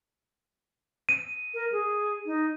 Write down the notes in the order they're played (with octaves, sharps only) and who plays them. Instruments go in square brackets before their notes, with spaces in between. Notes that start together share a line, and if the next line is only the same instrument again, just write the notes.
[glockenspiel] D#7
[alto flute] A#4
G#4
D#4